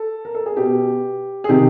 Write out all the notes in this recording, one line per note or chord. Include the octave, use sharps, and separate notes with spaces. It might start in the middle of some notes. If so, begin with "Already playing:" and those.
Already playing: A4
A#4
A4
G#4
B2 G4
G#4
C3 D#3 G4